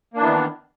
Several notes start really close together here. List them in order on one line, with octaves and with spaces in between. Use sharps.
A#3 D4 E3 B3 D#3